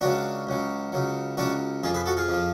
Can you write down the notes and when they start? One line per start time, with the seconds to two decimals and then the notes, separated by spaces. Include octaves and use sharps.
0.01 C#2 C#3 F#3 D4 F#4
0.47 C#2 C#3 F#3
0.92 C#2 C#3 F#3
1.37 C#2 C#3 F#3 D4 F#4
1.83 F2 F3 F4 G#4
1.94 G#4 B4
2.06 F#4 A4
2.17 F4 G#4
2.28 F2 F3